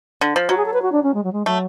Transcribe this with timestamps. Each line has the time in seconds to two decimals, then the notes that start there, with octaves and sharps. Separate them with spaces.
0.21 D3
0.36 F3
0.49 F#3 F#4
0.57 G#4
0.65 A4
0.73 B4
0.82 F#4
0.92 D4
1.03 C#4
1.14 G#3
1.23 F#3
1.32 G#3
1.46 F#3 A3